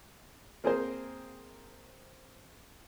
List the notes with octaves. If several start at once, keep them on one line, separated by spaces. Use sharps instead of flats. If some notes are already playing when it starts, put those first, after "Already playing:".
A#3 C4 G#4 A#4 C5